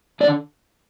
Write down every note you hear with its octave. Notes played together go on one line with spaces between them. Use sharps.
D3 D5